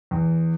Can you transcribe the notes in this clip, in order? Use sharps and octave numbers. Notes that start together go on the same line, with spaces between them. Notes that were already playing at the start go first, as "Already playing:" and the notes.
E2